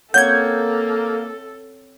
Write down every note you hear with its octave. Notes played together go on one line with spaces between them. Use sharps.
A#3 C4 A4 C#5 F#5 G6 G#6